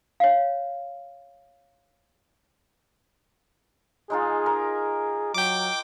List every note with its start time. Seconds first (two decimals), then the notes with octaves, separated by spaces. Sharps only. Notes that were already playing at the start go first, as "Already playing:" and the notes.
0.20 C#5 F5
4.10 G#3 D#4 F4 G#4
4.46 A#4
5.35 F#3 G5 D6